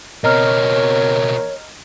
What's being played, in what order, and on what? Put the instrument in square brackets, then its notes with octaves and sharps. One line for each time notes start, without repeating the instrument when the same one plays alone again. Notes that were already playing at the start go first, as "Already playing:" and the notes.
[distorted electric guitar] B2 C4 [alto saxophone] A#4 [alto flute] C#5 [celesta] D#5 A#5 F6